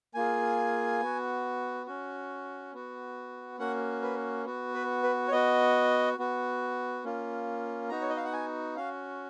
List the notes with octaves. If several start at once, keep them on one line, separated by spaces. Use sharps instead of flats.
A#3 F4 G#4 G#5
B3 F#4
C#4 F#4
B3 F#4
A#3 C#4 F#4 F#5
B4
B3 F#4
B4
B4
C#5
B3 F#4 D#5
B3 F#4
A#3 C#4 F4
B3 D#4 F#4 A#5
C#5
D#5
F5
F#5
G#5
C#4 F#4 F5